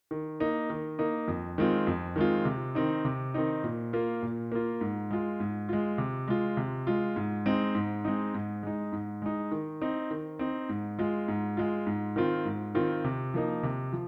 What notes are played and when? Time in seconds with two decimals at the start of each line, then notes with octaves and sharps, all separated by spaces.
0.11 D#3
0.40 A#3 D#4
0.70 D#3
0.99 A#3 D#4
1.28 F2
1.58 D#3 G#3 C4 F4
1.87 F2
2.16 D#3 G#3 C4 F4
2.45 C3
2.75 D#3 C4 D#4
3.05 C3
3.34 D#3 C4 D#4
3.64 A#2
3.93 A#3 F4
4.22 A#2
4.52 A#3 F4
4.81 G#2
5.11 G#3 F4
5.40 G#2
5.69 G#3 F4
5.98 C3
6.28 G#3 F4
6.57 C3
6.87 G#3 F4
7.16 G#2
7.46 G#3 C4 D#4
7.75 G#2
8.05 G#3 C4 D#4
8.34 G#2
8.63 G#3 D#4
8.92 G#2
9.22 G#3 D#4
9.51 D#3
9.82 C4 D#4
10.11 D#3
10.39 C4 D#4
10.69 G#2
10.99 G#3 F4
11.28 G#2
11.57 G#3 F4
11.87 G#2
12.16 D#3 C4 F4
12.45 G#2
12.75 D#3 C4 F4
13.04 C3
13.34 F3 A#3 D#4
13.63 C3
13.93 F3